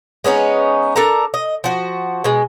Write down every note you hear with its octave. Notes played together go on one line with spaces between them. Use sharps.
G#3 B3 C#4 D#4
D4 A4 A#4 A#5
D#5
F3 F#4
B2 G#3